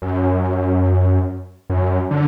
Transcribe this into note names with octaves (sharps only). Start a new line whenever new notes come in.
F#2
F#2
D3